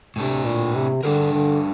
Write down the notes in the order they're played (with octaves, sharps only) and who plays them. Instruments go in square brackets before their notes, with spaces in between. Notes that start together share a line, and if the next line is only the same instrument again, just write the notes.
[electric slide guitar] A2 A3 D4 [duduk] C3
[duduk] A#2
C3
[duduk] D3 [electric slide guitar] G3 D4 G4 A#4
[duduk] D3